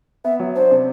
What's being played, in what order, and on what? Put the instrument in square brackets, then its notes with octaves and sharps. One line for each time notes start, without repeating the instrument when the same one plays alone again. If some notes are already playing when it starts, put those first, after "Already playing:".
[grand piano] B3 [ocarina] E5
[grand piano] F#3
[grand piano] D4 [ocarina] C5
[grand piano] C3